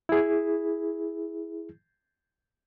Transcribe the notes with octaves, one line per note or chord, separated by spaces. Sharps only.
E4 G#4